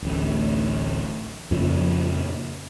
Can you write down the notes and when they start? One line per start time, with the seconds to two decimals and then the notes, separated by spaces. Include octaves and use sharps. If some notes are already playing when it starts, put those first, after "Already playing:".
0.02 D1 A1
1.51 F2 A#2 C#3 F3